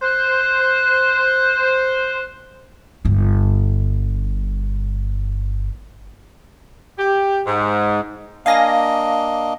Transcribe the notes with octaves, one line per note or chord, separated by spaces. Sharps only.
C5 F#6
G1 G2
G4
G#2
A#3 D4 D#5 F5 G#5 A#6